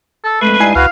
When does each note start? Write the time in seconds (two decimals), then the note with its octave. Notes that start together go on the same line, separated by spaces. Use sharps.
0.24 A4
0.41 F2 G#3 A3 B4
0.60 G2 G3 D#4 E4 G#5 C7
0.75 C#2 F#4 B4 F5